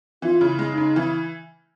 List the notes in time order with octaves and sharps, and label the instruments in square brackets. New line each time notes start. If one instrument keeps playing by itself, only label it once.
[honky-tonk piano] E3 [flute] F4
[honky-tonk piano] C#3
[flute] E4
[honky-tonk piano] G#3
[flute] D#4
[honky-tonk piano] C#3
[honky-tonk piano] E3 [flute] E4